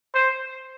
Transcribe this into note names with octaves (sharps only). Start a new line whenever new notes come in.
C5